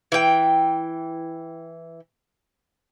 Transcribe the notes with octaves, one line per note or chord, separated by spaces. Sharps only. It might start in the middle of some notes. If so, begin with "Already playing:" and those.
E3 G5